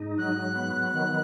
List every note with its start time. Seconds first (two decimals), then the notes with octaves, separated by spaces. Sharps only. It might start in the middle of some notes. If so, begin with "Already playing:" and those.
Already playing: G#2 D#4
0.18 F#3 F#6
0.56 B3
0.94 D#3